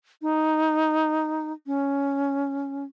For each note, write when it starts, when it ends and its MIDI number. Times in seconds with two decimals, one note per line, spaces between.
0.22 1.53 63
1.66 2.84 61